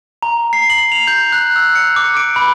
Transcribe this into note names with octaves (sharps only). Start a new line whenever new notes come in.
A#5
C7
F#7
F7
G6
F#6
E6
C#7
D6
D7
B5